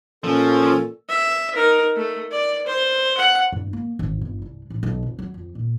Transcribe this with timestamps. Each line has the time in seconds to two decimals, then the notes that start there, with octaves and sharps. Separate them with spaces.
0.24 A#2 F3 C#4 A4
1.09 E5
1.55 D#4 A#4
1.96 A3
2.31 D5
2.66 C5
3.17 F#5
3.52 G2
3.73 A#3
3.99 G#1
4.21 G1
4.42 C2
4.70 A1
4.83 B1
5.03 F1
5.19 F#3
5.34 F2
5.55 A#2